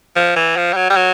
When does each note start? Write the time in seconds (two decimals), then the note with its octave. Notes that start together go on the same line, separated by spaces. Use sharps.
0.16 F3
0.36 E3
0.57 F3
0.73 G3
0.76 F#3
0.90 G3
0.96 F#3